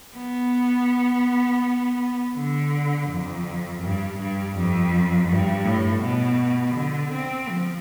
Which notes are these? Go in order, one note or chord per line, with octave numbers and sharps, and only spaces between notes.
B3
D3
F2
G2
G2
F2
G2
A2
B2
D3
C4
F3